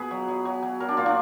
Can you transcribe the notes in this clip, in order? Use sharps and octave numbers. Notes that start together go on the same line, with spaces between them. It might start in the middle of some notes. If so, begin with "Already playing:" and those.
Already playing: B2 G#4 B4
F#3
F#3
F#3
F#3
F#3 A#4
D4
A#2 F4
D4